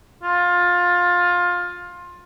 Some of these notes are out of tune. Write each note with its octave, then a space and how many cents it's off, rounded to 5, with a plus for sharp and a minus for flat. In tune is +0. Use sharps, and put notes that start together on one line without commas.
F4 +20